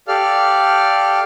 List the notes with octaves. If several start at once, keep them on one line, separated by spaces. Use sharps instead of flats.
G4 A4 D5 F5 F6